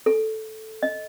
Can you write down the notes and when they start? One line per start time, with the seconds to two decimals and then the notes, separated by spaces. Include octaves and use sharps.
0.06 A4
0.83 D#5